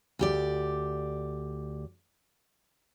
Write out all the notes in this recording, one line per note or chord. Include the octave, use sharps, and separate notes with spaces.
D2 G4 D5